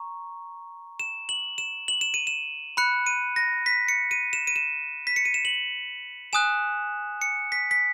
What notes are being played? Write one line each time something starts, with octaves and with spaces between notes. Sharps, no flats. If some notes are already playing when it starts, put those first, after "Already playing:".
Already playing: A#5 C#6
E7
F#7
E7
F#7
E7
D#7
E7
B5 F#6 C#7
D#7
A#6
B6
C#7
D#7
E7
D#7
E7
B6
C#7
D#7
E7
F#7
G#5 D#6 F#6 E7
C#7
B6
B6